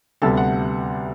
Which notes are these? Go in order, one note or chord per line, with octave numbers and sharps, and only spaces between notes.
D2 C3 G3 B3 A4 A5
F#5